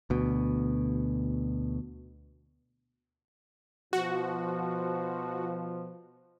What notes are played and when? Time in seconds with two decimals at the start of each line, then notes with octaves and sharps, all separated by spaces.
0.10 D2 B2
3.93 B2 F3 F#4